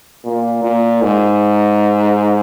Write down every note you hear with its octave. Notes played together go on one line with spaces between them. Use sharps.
A#2
A#2
G#2